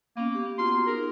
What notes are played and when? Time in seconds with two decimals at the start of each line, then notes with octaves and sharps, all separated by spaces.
0.17 A#3 B3 C#4
0.35 G4
0.58 B3 F4 F#4 A#5 C6
0.87 D#4 G#4 A#4